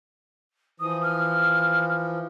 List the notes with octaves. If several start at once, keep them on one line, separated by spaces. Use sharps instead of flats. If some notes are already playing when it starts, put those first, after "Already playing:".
E3 F3 D#6
F6